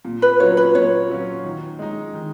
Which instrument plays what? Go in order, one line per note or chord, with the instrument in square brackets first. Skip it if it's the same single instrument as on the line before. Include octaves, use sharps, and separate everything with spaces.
[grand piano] A#2
[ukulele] B4
[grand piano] F#3 C#4 F4 [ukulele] C#5
[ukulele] B4
[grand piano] A#2 [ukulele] C#5
[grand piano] F#3 C#4 F4
D#3
G#3 D#4
D#3